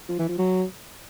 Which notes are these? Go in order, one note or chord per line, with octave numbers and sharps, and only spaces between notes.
F3
E3
F3
F#3